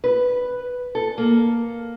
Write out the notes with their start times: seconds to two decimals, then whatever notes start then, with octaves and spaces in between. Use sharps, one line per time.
0.04 B4
0.95 A4
1.18 A#3